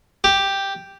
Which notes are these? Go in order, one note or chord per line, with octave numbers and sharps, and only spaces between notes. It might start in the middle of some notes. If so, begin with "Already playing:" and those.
G4